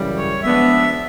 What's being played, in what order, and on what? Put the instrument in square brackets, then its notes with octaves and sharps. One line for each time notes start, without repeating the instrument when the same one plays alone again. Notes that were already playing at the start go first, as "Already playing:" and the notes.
Already playing: [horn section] F#2 C#3 E3 G3
[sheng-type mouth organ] C#5
[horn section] F3 G#3 B3 D4 [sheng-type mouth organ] E5